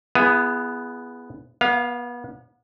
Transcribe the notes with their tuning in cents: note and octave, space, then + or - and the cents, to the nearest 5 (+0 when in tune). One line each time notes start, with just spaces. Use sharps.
B3 +0 E4 +40 G#4 +0
B3 -30 F5 +10